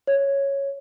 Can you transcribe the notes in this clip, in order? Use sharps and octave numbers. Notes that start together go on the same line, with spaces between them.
C#5